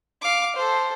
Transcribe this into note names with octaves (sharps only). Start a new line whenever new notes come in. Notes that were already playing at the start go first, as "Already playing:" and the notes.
F5 D6
A4 C5